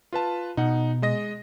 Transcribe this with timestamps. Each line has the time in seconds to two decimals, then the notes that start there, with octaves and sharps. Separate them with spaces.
0.12 F4 B4 A5
0.57 B2 D#4 F#5
1.02 G#3 D#5 A#6